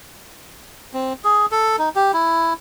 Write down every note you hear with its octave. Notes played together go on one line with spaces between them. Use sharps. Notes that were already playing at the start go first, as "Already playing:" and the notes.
C4
G#4
A4
D#4
G4
E4